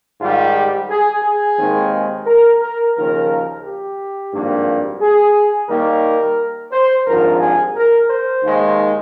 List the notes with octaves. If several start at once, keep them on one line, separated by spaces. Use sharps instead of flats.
G#2 D#3 G3 F4
G4
G#4
G#4
D#2 D#3 G#3 C4
A#4
A#4
D#2 C#3 F3 A#4
G4
G#1 G2 F3 A#3
G#4
D#2 D#3 G3 A#3 A#4
C5
G#1 G2 F3 A#4
G#4
A#4
C5
D#2 D#3 G#3